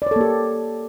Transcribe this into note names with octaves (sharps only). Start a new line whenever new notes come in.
A#3 G4 A4 C#5 D5